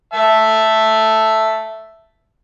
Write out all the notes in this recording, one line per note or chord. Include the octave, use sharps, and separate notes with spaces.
E5 A5